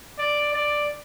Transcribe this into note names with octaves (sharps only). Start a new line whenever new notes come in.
D5
D5